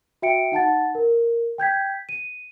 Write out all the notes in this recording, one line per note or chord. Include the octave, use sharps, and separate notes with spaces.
F#4 E5 G5 C#7 D7
D#4 F#5 A5 A6
A#4
G5 G6 G#6 B6
D#7